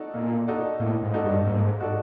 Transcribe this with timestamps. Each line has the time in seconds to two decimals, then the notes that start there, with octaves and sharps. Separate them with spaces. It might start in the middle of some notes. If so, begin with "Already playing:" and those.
Already playing: D#4 F#4 A4 D5
0.14 A#2 A#3
0.47 D#4 F#4 A4 D5
0.80 A2 A#3
1.02 G#2
1.14 D#4 F#4 A4 D5
1.24 G2
1.46 G#2 A#3
1.79 D#4 F#4 A4 D5